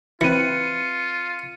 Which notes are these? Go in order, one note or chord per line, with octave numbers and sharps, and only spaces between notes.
E3 C4 F4 B4 C#7 D#7